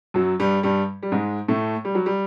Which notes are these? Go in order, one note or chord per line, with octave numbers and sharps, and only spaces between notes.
F#2 F#3
G2 G3
G2 G3
G3
G#2 G#3
A2 A3
G3
F#3
G3